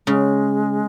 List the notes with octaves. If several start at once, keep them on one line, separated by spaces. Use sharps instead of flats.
C#3 G#3